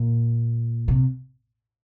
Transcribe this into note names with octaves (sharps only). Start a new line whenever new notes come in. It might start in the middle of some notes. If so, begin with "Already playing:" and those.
Already playing: A#2
C3